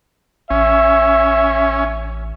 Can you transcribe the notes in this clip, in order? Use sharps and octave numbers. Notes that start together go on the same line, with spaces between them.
A1 C#4 E5